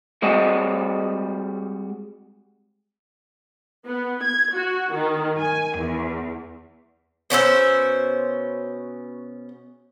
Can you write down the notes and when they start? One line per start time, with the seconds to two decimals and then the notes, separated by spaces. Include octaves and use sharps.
0.22 G3 G#3 C4 F#4 G4 D#5
3.86 B3
4.23 G#6
4.54 F#4
4.94 D#3
5.39 G#5
5.77 E2
7.30 B2 C#4 C5 E5